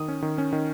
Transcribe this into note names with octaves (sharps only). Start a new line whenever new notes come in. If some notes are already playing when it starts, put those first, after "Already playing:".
Already playing: D#3 D#6
C#4
D#3
C#4
D#3